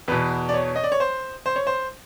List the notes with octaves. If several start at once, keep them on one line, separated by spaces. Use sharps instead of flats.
E2 B2 B4
D5
C#5
D#5
D5
C#5
C5
C5
C#5
C5